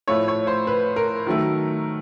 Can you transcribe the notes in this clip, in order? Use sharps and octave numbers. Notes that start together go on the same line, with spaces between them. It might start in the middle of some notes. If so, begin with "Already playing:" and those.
A2 F3 A3 C#5
C#5
C5
B4
A#4
D#3 F#3 A3